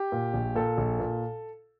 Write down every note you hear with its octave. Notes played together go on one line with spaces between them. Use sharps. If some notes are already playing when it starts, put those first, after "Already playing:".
Already playing: G4
A#2
A#1
A#2 A4
A#1
A#2